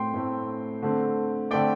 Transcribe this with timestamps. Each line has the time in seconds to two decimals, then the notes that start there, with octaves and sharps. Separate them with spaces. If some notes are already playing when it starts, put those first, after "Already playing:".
Already playing: A2 A3 C4 G5 C6
0.14 A2 A3 C4
0.83 D3 A3 C4
1.51 D3 A3 C4 D5 G5